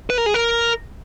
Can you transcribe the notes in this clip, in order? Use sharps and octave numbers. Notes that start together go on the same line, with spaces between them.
B4
A#4
G#4
A#4